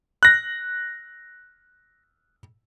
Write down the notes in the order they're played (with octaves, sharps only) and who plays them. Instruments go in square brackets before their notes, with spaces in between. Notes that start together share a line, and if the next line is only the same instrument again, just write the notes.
[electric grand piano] F#6 A#6